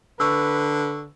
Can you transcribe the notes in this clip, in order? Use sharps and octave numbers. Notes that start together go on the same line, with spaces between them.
D3 B4 C#6 E6